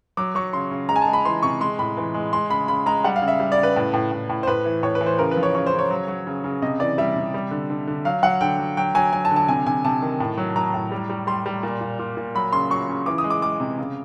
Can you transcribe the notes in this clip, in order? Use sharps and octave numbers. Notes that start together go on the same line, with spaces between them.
F#3 D6
F#3 C#6
C#3 C6
C#3
G#3 A#5
G#5
A5
G#3
B5
E3 C6
C3 C#6
G#3 C6
A2 B5
E3
G#3
G#3 C6
C#3 B5
C#3 B5
G#3 A#5
G3 F#5
F5
C#3
E5
G3
D5
C#3
B4
A2
A2
A2
A2
C5
A2 B4
E3
A2 C#5
B4
E3
C5
C#3 A#4
B4
F3
C#5
C#3 C#5
C5
C#3
C#5
F#3
F#3
C#3
C#3
C3 D#5
E3 D5
G3 E5
C3
G3
D3
D3
D3
F#3 F5
F#3 F#5
D3 G5
F#3
F#3 G5
F#3 G#5
F#3 G#5
A5
D3
A5
C3 G#5
C3 G#5
C3 A5
D#3
A2
F#3
F#3 A#5
A2
G3
G3
G3 C6
G3
A#2
A#2
A#2
A#2
F#3 B5
C#3 C6
F#3 C#6
C#3
E3 D6
D#6
G#3
D6
G#3 D6
C3
C#3